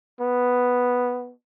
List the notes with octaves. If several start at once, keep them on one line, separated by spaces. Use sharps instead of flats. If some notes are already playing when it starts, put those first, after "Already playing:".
B3